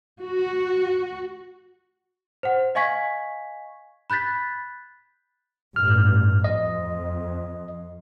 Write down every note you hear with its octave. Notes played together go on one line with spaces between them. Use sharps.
F#4
C5 F#5
D#5 F5 G#5 C#6 G#6 B6
B5 F#6 G6 A6 B6
A1 G2 F6
F2 D#5